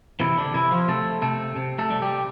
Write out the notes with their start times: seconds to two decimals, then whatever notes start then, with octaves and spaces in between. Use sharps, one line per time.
0.20 C3 E3 E4
0.37 D3 D4
0.54 C3 E3 E4
0.71 F3 F4
0.88 C3 A3 A4
1.22 C3 A3 A4
1.56 C3
1.79 A3 A4
1.90 G3
2.02 G3 G4